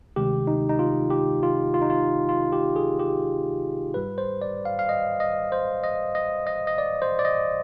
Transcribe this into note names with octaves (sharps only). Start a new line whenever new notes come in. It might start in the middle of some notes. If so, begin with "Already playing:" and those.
D2 C3 D#3 G#3 G4
D#4
D#4
F4
G4
F4
F4
D#4
F4
F4
G4
G#4
G4
G#2 G3 B4
C5
D5
F5
F5
D#5
D#5
C5
D#5
D#5
D#5
D#5
D5
C5
D5
D#5